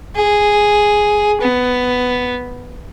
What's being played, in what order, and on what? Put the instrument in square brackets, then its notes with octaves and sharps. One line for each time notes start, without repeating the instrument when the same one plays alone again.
[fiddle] G#4
B3